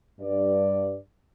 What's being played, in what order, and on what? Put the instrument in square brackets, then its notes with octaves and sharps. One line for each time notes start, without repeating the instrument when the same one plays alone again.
[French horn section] G2 D5